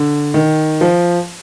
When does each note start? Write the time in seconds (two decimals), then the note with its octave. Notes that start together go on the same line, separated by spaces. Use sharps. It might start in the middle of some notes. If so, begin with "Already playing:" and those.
Already playing: D3
0.34 D#3
0.81 F3